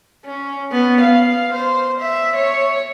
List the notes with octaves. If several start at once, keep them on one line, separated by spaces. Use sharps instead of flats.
C#4
B3
F5
C5
E5
C#5